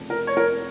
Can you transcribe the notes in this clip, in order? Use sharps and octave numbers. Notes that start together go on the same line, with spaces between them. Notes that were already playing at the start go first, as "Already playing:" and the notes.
Already playing: F1 F2 C#3
A#4
C#5
A#4